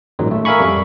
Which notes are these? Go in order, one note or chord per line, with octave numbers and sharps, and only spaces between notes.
A1 A#2 D#3 F#3 G#3
A3
A#4 E5 F5 G#5 B5 C#6
F2 G3